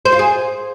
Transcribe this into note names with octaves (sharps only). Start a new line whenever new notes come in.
C5
F4
G#4